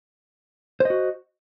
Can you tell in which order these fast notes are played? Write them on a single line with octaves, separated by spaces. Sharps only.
C5 D#5 F#4